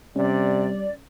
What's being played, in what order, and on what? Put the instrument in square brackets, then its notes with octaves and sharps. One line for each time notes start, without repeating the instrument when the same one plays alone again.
[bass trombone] C3 [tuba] G3 [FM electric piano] C#4 [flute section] D5